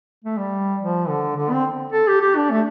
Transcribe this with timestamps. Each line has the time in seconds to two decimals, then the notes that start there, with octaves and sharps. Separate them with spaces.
0.25 A3
0.38 G3
0.81 F3
1.09 D3
1.37 D3
1.52 C4
1.93 A4
2.08 G4
2.21 G4
2.36 D4
2.51 A3